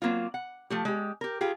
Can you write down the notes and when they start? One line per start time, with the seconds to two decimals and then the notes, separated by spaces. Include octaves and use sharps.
0.02 F#3 A#3 C4 F4
0.34 F#5
0.70 F3 A3 G4
0.85 G#3 G4
1.21 G4 A#4
1.41 F4 G4 G#4